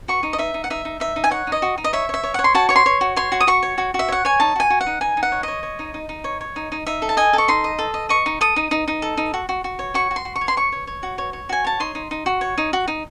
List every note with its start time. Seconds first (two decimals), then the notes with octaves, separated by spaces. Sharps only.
0.08 F#4 C#6
0.23 D#4
0.33 D#5
0.38 D#4 E5
0.54 D#4
0.64 F#5
0.70 D#4 E5
0.85 D#4
1.00 D#4 E5
1.16 D#4
1.24 G#5
1.31 C#5 F#5
1.47 D#4
1.52 D#5
1.62 F#4
1.78 D#4
1.84 D#5
1.93 C#5 E5
2.09 C#5 E5
2.23 C#5
2.34 C#5 F#5
2.44 C6
2.55 F#4 A5
2.69 C#5 C#6
2.76 C6
2.86 C#5
3.01 F#4
3.16 C#5 C6
3.32 F#4
3.40 D#6
3.47 F#4 C#6
3.63 C#5
3.78 F#4
3.94 F#4
3.99 E5
4.08 C#5 F#5
4.25 C#5 G#5
4.40 D#4 A5
4.56 F#4 G#5
4.70 F#4
4.81 F#5
4.86 D#4
5.01 D#4 G#5
5.17 D#4
5.23 F#5
5.32 C#5
5.43 C#5 D#5
5.63 C#5
5.79 D#4
5.94 D#4
6.09 D#4
6.24 C#5
6.41 C#5
6.56 D#4
6.72 D#4
6.87 D#4 E5
7.02 A4
7.09 A5
7.17 D#5 G#5
7.33 A4 C#6
7.48 D#4 C6
7.64 D#5
7.79 A4
7.94 D#5
8.09 D#5 C#6
8.26 D#4
8.41 A4 D#6
8.56 D#4
8.71 D#4
8.88 D#4
9.02 A4
9.17 D#4
9.34 F#4
9.49 F#4
9.64 F#4
9.79 C#5
9.94 F#4 C#6
10.11 F#4
10.16 C6
10.25 F#4
10.36 C#6
10.41 C#5
10.48 C6
10.57 C#5 C#6
10.72 C#5
10.87 C#5
11.03 F#4
11.18 C#5
11.33 C#5
11.49 F#4 G#5
11.64 C#5 A5
11.80 D#4 C6
11.95 D#4
12.11 D#4
12.26 F#4
12.41 C#5
12.58 D#4
12.73 F#4
12.88 D#4